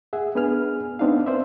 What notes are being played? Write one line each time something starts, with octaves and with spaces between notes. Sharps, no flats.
G#4 E5 F#5
B3 D4 G#4 B4 G#5 F6
B3 C4 D4 D#4 F5
B4 C5 D5 E5